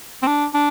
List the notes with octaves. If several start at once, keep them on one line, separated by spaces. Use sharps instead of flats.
C4
D4
D4